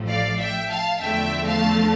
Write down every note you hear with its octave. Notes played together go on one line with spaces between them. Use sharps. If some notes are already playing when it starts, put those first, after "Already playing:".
Already playing: A1 A2 F3 A3
D5 F5
E5 G5
F5 A5
E2 D3 F3 A3 E5 G5
F5 A5